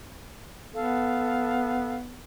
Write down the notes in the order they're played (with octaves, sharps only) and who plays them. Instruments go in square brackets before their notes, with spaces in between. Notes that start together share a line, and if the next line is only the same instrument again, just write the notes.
[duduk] B3 [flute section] A4 F5